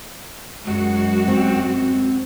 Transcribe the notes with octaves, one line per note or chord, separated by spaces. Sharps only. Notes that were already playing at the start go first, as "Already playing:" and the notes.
F#2 G#3 F#4
C4